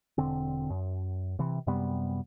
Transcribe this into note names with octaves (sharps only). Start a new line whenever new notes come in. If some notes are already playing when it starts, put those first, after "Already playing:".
E1 D3 C4
F#2
C3 E3
F#2 C3 G3 B3